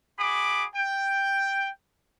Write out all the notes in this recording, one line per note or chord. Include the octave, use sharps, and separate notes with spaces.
F#4 G#4 B5 D6
G5